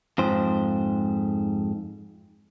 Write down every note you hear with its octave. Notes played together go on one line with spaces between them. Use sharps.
F2 G#2 C5